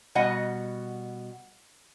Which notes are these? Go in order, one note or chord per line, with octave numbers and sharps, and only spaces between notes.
B2 G3 D#5 F#5